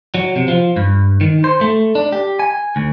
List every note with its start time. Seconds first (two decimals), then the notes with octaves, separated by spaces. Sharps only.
0.15 F#3
0.36 C3
0.48 F3
0.76 G2
1.21 D#3
1.44 C5
1.61 A3
1.95 D4
2.12 G4
2.39 G#5
2.76 D2